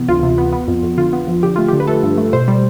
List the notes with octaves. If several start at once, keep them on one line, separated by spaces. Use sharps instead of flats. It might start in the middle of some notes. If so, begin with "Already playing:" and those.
Already playing: C3 E3 B3
D2 F4
C3
B3
B3
F2
F2
D3 F4
B3
F3
D3 G4
A3 F4
D3 G4
B4
A3 A4
G2
A3
B2 C5
G3